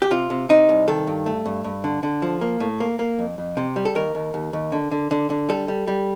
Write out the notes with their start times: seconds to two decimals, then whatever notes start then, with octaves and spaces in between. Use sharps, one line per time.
0.02 G4
0.11 C3 F4
0.30 C3
0.49 C3 D#4
0.69 C2
0.88 D#3 A4
1.07 G2
1.26 A3
1.46 G2
1.64 G2
1.84 D3
2.03 D3
2.22 F3
2.41 A#3
2.60 A2
2.80 A#3
2.99 A#3
3.19 F2
3.38 F2
3.57 C3
3.76 G3
3.85 A4
3.95 D#2 A#4
4.15 D#2
4.34 D#2
4.53 D#2
4.72 D3
4.91 D3
5.11 D3
5.30 D3
5.49 G3 A4
5.68 G3
5.87 G3